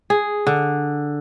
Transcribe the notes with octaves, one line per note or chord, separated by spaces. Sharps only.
G#4
D3